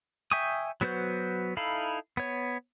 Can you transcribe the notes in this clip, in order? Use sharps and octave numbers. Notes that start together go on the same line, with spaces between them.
E5 G5 G#5 C#6 D#6
F#3 B3 F#4 B4 C5
D#4 E4 A4 F5 B5
B3 C#5